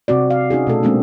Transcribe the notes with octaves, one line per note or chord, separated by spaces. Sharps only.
C3 C4 F#4 D5
F5
C#4 D#4 F#4 G#4
B2 A3 A4
G#3 A#3 C4 D4 F#4